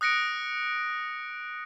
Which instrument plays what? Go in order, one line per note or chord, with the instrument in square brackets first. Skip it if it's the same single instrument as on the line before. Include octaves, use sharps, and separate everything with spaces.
[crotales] D#6 F#6 A#6 C#7 D7